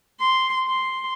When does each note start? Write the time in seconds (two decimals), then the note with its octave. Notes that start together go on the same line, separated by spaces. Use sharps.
0.20 C6
0.66 C6